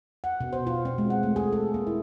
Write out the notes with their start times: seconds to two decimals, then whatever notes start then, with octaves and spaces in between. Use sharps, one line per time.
0.24 F#5
0.40 B2
0.53 C5
0.67 F4
0.85 C4
0.98 G#3
1.10 F#5
1.23 A3
1.36 G#4
1.53 A4
1.74 A#3
1.87 E4